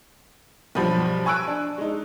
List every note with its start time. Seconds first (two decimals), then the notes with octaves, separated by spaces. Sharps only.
0.75 B1 G2 F3 B5
1.26 G#5 C#6 E6 F#6 D7
1.47 D4
1.78 G#3 D#4